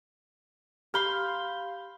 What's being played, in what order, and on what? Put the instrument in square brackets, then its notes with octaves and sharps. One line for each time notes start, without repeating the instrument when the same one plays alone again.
[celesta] G4 G6 G7 [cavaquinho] F5 B5 C6